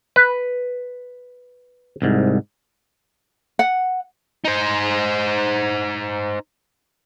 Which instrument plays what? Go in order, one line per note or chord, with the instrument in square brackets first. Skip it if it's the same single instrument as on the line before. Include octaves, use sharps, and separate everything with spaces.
[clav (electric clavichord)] B4
[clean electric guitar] C2 G#2
[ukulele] F#5
[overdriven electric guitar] D#4 C5